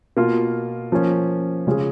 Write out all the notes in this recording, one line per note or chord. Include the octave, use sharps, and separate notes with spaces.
B2 A#3 F4
F3 A#3 C#4
C#3 G#3 C#4 F4 G#4